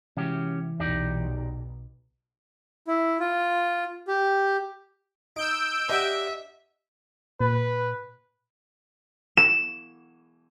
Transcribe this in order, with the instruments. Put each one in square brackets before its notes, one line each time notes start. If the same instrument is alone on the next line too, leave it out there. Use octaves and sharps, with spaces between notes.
[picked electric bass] C3 G#3 [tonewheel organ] E3 [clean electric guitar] C#4 F#4 G4
[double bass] B1 [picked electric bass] E2 A#2 [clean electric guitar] D#4 G4 D5
[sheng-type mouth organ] E4
F4
G4
[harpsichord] D#4 [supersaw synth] E6 G6 D7
[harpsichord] D4 G4 F#5 [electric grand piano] D#5 [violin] E5
[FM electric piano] A#2 [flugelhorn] B4
[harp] E7